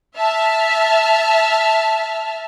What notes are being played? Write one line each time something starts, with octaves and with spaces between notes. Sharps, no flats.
E5 A5 F6